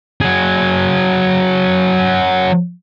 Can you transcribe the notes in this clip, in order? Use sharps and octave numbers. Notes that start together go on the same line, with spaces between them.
F#3 G#4